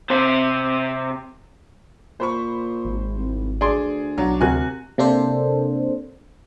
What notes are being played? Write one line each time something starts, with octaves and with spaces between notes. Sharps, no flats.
C3 C5
A#2 C5 B5 C#6
G#1
C2
D2 G#4 D5 C6
B1 F#3 D4
D2 C3 F#4 A#4 G#5 F#6
C3 A#3 D4 A4 C5